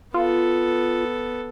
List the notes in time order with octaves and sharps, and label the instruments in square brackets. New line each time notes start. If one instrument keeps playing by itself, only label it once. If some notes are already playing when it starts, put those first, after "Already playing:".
[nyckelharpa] B3 A4 [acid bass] F4